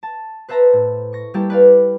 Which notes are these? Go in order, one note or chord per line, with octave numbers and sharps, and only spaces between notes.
A5
B4 C5 E5 A5 A#5 A#6
A2
C#6 A#6
G3 A#3 E4 G4 A4
B4 D5 F5